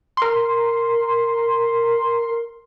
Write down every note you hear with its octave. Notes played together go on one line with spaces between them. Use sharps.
A#4 C6